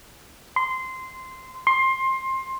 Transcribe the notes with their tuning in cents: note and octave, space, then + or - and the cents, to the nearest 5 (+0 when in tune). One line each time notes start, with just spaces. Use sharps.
C6 -15
C6 +20